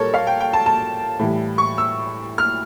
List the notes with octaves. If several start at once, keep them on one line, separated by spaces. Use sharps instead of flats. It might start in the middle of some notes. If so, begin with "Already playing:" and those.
Already playing: A#2 G3 A4 A#4 C#5
F5
G5
G5
A5
A5
A2 E3 G3
C#6
E6
F6